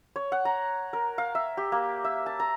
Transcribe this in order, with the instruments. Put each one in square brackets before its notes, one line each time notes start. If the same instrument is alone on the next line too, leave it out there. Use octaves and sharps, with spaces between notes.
[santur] C#5
F#5
A#5
A#4
F5
E5
G4
A#3
E5
A5
A#5